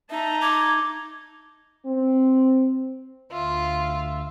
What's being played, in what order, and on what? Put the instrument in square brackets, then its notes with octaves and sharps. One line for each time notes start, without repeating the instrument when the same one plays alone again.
[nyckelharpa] D#4 [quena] E5 [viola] A5 A#5
[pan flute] D6 [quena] G#6
[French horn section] C4
[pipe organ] D2 E5 [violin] F4